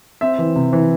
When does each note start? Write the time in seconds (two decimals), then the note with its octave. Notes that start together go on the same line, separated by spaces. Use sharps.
0.21 C4 E5
0.38 E3
0.56 C3
0.73 E3